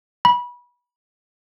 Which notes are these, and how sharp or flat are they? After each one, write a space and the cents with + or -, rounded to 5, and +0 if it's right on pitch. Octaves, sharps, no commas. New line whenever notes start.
B5 -25